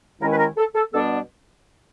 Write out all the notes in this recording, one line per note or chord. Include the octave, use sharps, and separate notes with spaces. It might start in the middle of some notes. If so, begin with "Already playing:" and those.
D#2 D#3 G#3 C#4 E4 A#4
B4
A#4
A4
A4
B2 G3 B3 D4 A4